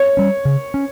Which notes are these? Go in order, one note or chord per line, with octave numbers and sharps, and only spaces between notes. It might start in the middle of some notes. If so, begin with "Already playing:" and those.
Already playing: C#5
G3 C#4
C#3
C#4